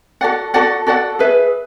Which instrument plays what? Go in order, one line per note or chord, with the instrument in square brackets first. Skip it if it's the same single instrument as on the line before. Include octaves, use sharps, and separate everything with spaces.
[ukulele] F#4 A4 D5 F#5
F#4 A4 D5 F#5
F#4 A4 D5 F#5
G#4 B4 E5